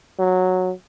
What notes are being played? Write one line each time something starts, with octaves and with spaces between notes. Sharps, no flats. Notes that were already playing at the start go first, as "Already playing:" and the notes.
F#3